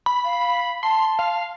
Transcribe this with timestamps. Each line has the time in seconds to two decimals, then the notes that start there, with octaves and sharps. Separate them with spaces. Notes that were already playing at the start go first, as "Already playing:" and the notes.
0.06 B5
0.24 F5
0.83 A5 C6
1.19 F5